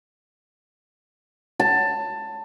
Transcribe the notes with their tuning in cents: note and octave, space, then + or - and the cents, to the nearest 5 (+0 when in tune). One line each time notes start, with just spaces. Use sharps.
A5 +15